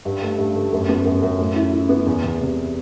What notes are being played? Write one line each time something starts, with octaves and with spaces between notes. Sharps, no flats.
G2
A3
G2
A3
F#2
B3
F#2
F#2
A2
E4
E4
B3
E2
E2
C3